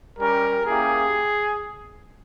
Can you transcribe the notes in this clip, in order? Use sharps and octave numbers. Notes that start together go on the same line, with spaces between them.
G3 C#4 G4 A#4
A#3 C#4 E4 G4 G#4